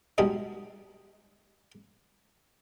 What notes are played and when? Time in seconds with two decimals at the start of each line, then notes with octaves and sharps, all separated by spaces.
0.18 B2 G3 G#3 D#4